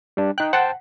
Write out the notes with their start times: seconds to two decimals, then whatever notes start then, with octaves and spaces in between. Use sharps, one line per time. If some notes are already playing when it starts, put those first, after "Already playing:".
0.17 G3 D4
0.38 D#4 G5 F#6
0.53 C5 F#5 G5 A5